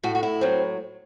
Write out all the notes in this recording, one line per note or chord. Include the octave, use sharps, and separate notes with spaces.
A2 F#4
F#4
E4
F#3 C4